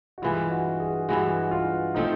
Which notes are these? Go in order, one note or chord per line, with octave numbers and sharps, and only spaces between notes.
F#4
G2 E3 G#3 F4
F#4
G#4
G2 E3 G#3 F#4
F4
F3 A3 C4 D#4